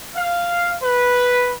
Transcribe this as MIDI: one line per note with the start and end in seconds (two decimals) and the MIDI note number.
0.16 0.76 77
0.81 1.54 71